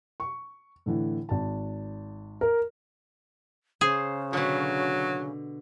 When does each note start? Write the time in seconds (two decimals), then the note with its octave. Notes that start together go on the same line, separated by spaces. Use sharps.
0.20 C#6
0.86 A2 D3 E3
1.29 G#1 A5
2.41 A#4
3.81 C#3 G#4 C5
4.33 B2 D3 F#3